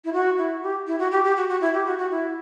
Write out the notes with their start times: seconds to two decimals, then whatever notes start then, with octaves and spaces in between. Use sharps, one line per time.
0.04 E4
0.13 F#4
0.38 E4
0.62 G4
0.87 E4
0.99 F#4
1.11 G4
1.24 G4
1.36 F#4
1.49 F#4
1.61 E4
1.73 G4
1.86 F#4
1.98 F#4
2.11 E4